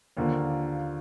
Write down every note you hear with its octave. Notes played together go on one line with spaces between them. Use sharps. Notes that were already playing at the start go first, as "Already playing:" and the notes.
D#2 D3 F3 A#3